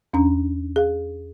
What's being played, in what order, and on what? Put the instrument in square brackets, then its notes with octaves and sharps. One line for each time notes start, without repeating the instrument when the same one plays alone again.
[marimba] E2 C#4 D4 A#5
G#4 F5